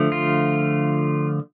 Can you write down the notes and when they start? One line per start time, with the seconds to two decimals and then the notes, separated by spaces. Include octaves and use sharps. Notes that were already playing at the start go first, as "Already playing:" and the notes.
Already playing: D3 F3 A3
0.12 F4